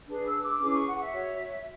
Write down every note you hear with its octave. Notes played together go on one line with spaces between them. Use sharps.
D4 G#4 B4
E6
D6
C#4 E4 G#4 B4 D6
C#6
F#5
E5
F#4 C#5